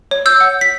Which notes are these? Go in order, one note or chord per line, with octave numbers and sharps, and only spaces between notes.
C#5
E6 G6
F#5
B6